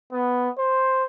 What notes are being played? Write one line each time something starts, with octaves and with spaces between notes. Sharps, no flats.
B3
C5